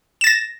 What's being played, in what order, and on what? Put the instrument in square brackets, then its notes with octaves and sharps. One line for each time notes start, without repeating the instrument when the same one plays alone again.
[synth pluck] E7
A6
A#6